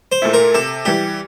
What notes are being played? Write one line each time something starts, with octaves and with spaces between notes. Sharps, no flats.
C5
A#2 A3 E4
A#4
C3 A4
E3 G3 G4